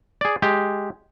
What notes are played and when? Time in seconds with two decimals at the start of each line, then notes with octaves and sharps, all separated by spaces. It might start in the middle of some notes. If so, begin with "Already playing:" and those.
0.21 G#4 D5
0.42 G#3 G4